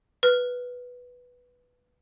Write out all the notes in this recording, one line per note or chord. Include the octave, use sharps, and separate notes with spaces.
B4 F6